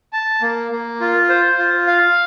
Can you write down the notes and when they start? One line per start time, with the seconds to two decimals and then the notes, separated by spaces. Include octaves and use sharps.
0.13 A5
0.42 A#3
0.72 A#3
1.00 F4
1.29 C5
1.58 F4
1.87 F5